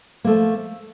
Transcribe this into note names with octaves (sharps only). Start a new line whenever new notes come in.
F3 A3 A#3